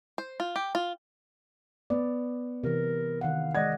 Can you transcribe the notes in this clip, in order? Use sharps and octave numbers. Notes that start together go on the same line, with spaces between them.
C5
F4
G4
F4
B3 D5
C3 E3 A#4
D#3 F5 F#5
G#3 D5 D#5 F#5 G#6